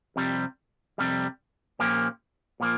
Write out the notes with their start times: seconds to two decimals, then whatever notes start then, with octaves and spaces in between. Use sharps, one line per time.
0.16 F2 C3 G3
0.98 F2 C3 G3
1.79 A#2 F3 A#3 C#4 G4
2.60 A#2 F3 A#3